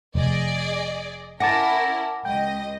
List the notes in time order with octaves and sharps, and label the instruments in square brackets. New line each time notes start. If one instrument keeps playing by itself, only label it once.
[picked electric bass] F1 [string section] G#4 D5 D#5
[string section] C#4 E4 A#4 [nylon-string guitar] F#5 G#5 [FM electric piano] A5 D6 A#6
[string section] C#2 D#5 [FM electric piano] G5